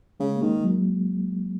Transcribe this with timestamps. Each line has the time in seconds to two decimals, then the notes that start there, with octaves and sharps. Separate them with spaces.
0.20 C#3 G#3
0.35 A#3
0.42 D#3 G#3
0.64 F#3